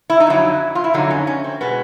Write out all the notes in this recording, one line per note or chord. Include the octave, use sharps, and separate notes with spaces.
E4
D#4
F2 D3 F#3 E4
F4
E4
F2 D3 F#3 D#4
C#4
C#4
C4
B2 G#3 B3